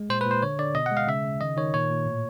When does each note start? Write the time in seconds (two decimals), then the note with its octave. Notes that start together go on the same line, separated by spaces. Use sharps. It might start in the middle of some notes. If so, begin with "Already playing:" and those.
Already playing: G#3
0.09 A#2 C5
0.21 B4
0.26 A#2 C5
0.42 D3 C#5
0.59 D3 D5
0.75 B2 D#5
0.86 F#5
0.91 G#3
0.97 F5
1.07 C#3 E5
1.25 C#3
1.41 D#3 D#5
1.57 D#3 C#5
1.74 A#2 C#5
1.90 A#2
2.06 A2